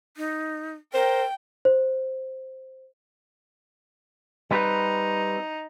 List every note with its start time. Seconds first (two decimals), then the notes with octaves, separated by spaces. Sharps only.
0.17 D#4
0.94 A#4 C5 G5
1.65 C5
4.51 G3 C4 D#4 B4